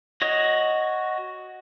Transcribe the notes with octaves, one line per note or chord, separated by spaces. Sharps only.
F#4 C#5 D#5 D#6